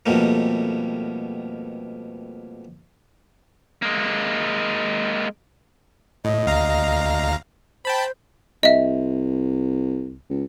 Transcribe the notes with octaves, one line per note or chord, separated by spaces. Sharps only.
F2 B2 G3 A3 A#3
G#3 A#3
A2 D#5
D2 F5 A#5
C5 G5 A5 B5
C2 D#5 E5
C#2